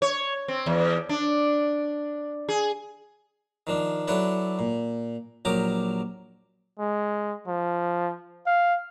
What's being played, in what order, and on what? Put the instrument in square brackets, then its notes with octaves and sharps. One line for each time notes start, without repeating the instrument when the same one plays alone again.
[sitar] C#5
C4
E2
D4
G#4
[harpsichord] D#3 F3 D4
F#3 D4 E4 A4 B4 D5
A#2
A#1 F#3 G4 A#4 D6 D#6
[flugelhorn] G#3
F3
F5